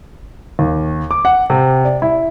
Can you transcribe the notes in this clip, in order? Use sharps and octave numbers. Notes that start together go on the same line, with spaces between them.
D#2
D6
F#5
C3
D5
E4